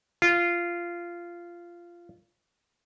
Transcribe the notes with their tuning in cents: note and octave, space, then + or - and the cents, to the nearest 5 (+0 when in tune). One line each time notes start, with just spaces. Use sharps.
F4 -15